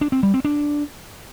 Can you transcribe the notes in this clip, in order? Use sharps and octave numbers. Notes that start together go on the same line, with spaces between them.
D4
C4
G3
C4
D4